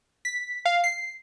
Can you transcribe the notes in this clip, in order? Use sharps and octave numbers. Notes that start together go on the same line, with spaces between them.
B6
F5
C7